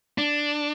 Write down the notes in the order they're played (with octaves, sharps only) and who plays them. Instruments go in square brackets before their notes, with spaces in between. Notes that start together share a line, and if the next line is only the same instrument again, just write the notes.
[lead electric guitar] D4